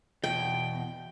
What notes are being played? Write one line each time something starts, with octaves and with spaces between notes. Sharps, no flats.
E2 B2 G5